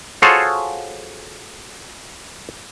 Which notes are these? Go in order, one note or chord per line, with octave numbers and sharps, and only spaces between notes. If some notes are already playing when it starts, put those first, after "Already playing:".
F4 F#4 G#4 A4 C5 C#5